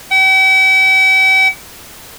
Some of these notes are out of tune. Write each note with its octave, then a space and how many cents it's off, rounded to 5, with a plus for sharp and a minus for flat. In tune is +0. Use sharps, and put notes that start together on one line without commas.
G5 -45